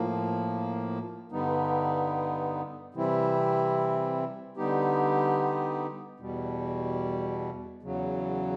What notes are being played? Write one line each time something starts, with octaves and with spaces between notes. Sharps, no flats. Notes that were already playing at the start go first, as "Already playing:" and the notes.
Already playing: A2 F3 A#3
G2 D3 G3 B3 D#4
C3 E3 G3 C4 E4
D3 G3 B3 D#4 G4
E2 B2 G3
E2 C#3 F#3